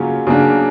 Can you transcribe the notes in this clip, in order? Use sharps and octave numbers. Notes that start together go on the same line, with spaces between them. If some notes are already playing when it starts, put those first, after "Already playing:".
Already playing: C#3 F#3 A#3 C#4 F4
C#3 F#3 A#3 D4